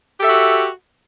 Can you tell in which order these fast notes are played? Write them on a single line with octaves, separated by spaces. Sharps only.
G4 A4 E5 F#4